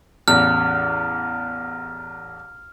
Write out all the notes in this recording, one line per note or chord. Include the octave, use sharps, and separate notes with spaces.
A1 E2 F6